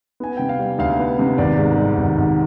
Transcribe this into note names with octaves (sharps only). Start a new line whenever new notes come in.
B3 G#5
C3 G5
F5
G3
D2 F5
B3
C3
G#1 D5
G#2
G3
G#1
G#1